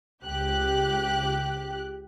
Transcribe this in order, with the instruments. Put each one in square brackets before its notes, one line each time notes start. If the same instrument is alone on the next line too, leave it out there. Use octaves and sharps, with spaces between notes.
[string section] C#2 G4 F#6